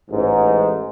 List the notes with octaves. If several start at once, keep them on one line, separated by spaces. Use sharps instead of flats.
A1 G#2